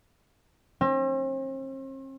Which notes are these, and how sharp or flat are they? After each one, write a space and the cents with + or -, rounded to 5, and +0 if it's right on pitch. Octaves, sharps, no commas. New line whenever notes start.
C4 +45